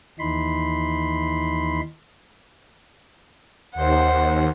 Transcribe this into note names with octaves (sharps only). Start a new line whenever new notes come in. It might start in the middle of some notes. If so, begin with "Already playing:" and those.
D#2 E3 D#4 B5 C6
D#2 C5 F#5